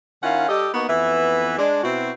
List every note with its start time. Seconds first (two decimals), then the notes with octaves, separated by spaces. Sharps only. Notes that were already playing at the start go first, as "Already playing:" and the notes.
0.23 D#3 C#4 E4 F4 F5 F#5
0.49 G3 G4 A4 D#5
0.74 A#3 B3 D#4 F#4
0.88 F2 E3 B3 B4 E5
1.58 G#3 D4
1.84 B2 C4 E4 F#4